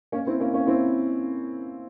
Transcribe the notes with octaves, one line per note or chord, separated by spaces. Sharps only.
A#3 C#4
C4 E4
A#3 C#4
A#3 C#4
C4 E4